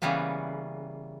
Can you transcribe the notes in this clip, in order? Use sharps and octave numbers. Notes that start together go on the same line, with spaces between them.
C#3 E3 G3 A#3 B3